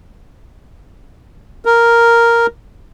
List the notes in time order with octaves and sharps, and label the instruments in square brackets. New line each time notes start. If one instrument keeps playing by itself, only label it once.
[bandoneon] A#4